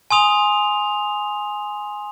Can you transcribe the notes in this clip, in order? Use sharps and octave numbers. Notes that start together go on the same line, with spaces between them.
G#5 C6 D#6 F7